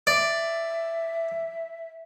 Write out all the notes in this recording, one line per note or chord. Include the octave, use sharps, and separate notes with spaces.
D5 E5